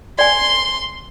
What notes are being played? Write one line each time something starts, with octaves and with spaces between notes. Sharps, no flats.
D5 G#5 C6